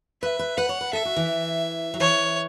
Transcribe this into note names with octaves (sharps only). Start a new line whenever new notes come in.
B4 E5
B4
B4 F#5
C#5
B4
A4 E5
F#4
E3
F#3
E3 C#5